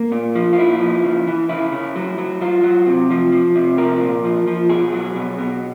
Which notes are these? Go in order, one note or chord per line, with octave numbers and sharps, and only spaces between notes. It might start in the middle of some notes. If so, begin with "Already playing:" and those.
Already playing: A#3
A#2
F3
F4
A#2 E4
F3
C#3
E3
C#3 E4
C#3
F#3
F#3
F#3 F4
F#3
C3
F3
F3
C3
F3 A#4
A#2
F3
F3
B2 G#4
F#3
B2
B2